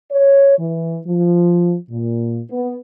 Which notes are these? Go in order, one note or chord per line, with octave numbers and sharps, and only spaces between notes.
C#5
E3
F3
A#2
B3